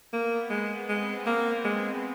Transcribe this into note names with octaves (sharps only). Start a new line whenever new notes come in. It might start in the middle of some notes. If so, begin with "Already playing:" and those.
A#3 B3
G#3
G#3 C4
A#3
G#3